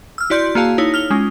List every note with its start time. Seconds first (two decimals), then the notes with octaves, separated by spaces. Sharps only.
0.18 E6 F6
0.30 E4 F#4 D5 C6 G6
0.55 A#3 F#4 G#4 F5 A5
0.78 D#4 E4 C#5
0.94 F6 F7 G7
1.10 G#3 C#4 F4